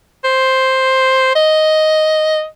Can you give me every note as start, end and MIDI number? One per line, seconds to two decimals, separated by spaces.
0.24 1.31 72
1.35 2.46 75